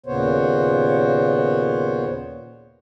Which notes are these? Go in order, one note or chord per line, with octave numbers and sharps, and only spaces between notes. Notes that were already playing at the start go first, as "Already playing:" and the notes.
D#2 A#2 C#3 B3 C5 C#5